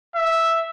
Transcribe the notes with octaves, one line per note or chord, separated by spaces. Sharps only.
E5